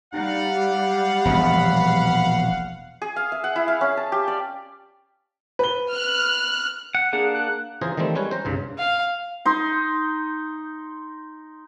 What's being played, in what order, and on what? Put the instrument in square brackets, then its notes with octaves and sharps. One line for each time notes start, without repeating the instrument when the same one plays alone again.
[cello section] G3 [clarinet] D#4 [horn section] F5 F#5
[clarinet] G4
[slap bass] E1 A#1 E2 [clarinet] B5
[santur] G#4
F5
E5
F#5
E4
F5
C#4
A5
G4
D5
[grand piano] B4 G7
[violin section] F6 F#6
[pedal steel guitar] F#5
[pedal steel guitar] A#3 D4 F#5 [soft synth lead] G#4
[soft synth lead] F#6
[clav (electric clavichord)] C#3 E3 F4 G#4 C5 A#5
D#3 E3 G3 A3 C4
G3 G#3 C#4 B4 C#5
C5 A#5
C2 G2 C#3
[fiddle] F5
[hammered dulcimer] D#4 C6